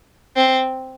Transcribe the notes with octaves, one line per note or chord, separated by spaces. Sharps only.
C4